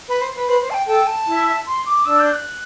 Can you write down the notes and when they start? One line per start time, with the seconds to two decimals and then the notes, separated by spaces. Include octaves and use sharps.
0.08 B4
0.21 C5
0.35 B4
0.47 B4 C5 B5
0.61 C5
0.70 A5
0.74 G5
0.87 A4 G5 A5
1.07 A5
1.27 E4 E5
1.66 C6
1.86 D6
2.06 D4 D5 E6
2.19 G6
2.33 F#6